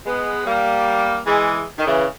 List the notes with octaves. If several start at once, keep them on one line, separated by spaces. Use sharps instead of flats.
G#3 B3
G3 A#3
E3 G#3
D#3
C#3 E3